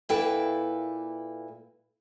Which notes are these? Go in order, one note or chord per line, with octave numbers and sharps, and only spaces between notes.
A#2 A#3 E4 A4 B4 G5